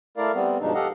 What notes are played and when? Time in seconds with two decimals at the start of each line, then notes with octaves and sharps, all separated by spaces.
0.17 A3 E4 A#4 D5 F5
0.34 G3 B3 C4
0.61 G2 B2 F3 G#3 D4 D#4
0.74 G4 A4 D#5 F5 F#5